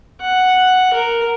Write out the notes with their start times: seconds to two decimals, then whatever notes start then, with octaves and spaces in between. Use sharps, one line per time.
0.21 F#5
0.94 A#4